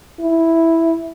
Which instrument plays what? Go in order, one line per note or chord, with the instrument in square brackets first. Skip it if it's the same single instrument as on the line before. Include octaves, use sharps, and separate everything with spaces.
[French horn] E4